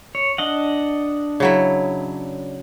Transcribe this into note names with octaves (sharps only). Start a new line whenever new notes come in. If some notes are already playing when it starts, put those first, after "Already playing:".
C#5
D4 D#5 F#5
C#3 F#3 E4